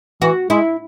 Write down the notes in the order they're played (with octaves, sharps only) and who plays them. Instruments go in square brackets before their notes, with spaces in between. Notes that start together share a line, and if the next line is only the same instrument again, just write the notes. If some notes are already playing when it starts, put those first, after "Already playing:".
[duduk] E3 [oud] F#4
[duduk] G#3 [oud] E4